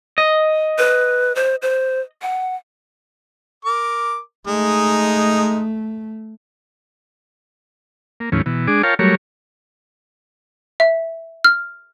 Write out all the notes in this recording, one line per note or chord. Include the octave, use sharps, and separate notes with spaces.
D#5
B4
C5
C5
F#5
A#4 D6
G#3 A3 D#4
A#3
D#2 A2 E3 F3 C#4
B2 E3
G#3 D4 G#4 D6
F4 A#4 C#5 F5 G5 A5
F#3 G3 A3 A#4 C#5
E5
F6